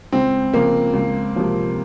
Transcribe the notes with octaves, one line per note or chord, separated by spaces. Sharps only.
C#2 C4
C#3 F3 G#3 A#3
C#2
C3 F3 A#3